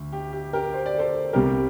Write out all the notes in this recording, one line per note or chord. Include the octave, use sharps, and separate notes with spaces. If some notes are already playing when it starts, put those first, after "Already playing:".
Already playing: D2
G4
G4
G4 A#4
C5
D5
A4 C5
C2 C3 G3 G4 A#4